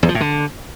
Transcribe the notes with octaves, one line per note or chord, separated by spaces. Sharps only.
E2
F3
A2
D3